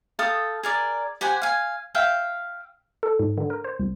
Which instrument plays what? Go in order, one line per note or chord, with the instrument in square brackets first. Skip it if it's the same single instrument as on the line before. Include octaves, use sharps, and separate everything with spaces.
[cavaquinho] A4 F5 G5 D#6
G#4 A#4 D5
G4 C5 F#5 G#5
F5 G#5
E5 F5 G5
[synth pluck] A4
G#2
D3
A#4
C5
C2